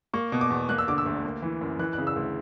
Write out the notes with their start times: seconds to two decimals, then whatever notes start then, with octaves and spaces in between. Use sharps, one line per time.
0.14 A#3 C#6
0.32 B2
0.41 D6
0.50 E2
0.69 A#3 F#6
0.78 E6
0.88 D3 D6
0.98 E6
1.06 D2
1.24 A#3
1.42 E3
1.61 F#2
1.79 E3 F#6
1.93 F#6
1.98 C#3
2.07 E6
2.16 D2